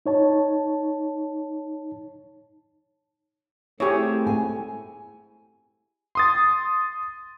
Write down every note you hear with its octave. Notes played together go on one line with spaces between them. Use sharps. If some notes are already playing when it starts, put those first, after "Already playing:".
D#4 C#5 A5
A3 C4 E4 G4 G#4 C#5
G#5
C6 D#6 A6